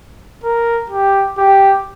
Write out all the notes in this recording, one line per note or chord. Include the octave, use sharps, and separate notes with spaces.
A#4
G4
G4